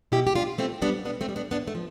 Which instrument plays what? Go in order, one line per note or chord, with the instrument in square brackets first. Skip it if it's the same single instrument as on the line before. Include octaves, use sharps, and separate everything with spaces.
[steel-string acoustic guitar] B2 E4 G4
G4
G3 D4 F4
B2 A3 C4
G3 B3 D4
B2 B3 D4
A3 C4
G3
B3 D4
A2 B3 D4
A3
F3